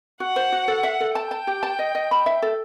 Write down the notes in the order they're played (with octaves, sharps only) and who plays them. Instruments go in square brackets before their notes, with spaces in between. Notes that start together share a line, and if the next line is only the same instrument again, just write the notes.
[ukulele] F#4 [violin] F#5
[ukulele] C5
F#4
A4
E5
A4
[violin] G5 [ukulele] A5
[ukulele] A5
G4
A5
D#5
D#5
B5
E5
A4